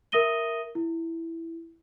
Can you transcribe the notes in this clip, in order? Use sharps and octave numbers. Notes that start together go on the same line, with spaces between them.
A#4 E5 D#6 A#6 D#7 G7
E4